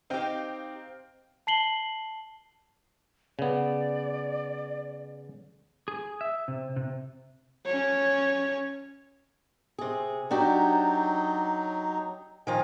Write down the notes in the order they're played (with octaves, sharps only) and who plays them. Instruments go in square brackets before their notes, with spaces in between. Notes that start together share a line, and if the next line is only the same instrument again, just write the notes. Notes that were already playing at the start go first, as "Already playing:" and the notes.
[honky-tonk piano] C4 F5 G5 [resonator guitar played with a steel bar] D#4 G4
[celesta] A5 C7 F#7 G7
[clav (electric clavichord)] C#3 B3 [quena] D5
[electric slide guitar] G#4
E5
C3
C3
[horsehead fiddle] C#4 C#5
[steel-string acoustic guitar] C3 G#4
[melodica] F#3 D#4 [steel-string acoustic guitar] D4 F#4 G4
[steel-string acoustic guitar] D#3 F3 A#5 [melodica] G#5